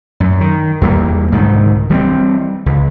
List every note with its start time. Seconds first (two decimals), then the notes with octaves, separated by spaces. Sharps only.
0.20 F#2
0.41 D#3
0.81 E2 G3 A#3
1.32 C2 G#2 D3 D#3
1.89 E3 G3 G#3 C4
2.66 C#2